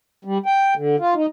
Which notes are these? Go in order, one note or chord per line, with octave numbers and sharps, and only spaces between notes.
G3
G5
D3
F4
D#4